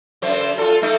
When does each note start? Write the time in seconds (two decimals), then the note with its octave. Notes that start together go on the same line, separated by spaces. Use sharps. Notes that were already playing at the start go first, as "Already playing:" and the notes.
0.22 F#2 D3 C5
0.58 F4 A4
0.82 A3 A#3 D#4